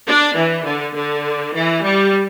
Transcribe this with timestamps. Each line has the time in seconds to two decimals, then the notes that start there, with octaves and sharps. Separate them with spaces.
0.08 D4
0.37 E3
0.66 D3
0.96 D3
1.54 E3
1.83 G3